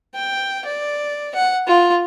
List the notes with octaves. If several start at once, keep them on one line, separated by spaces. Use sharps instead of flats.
G5
D5
F#5
F4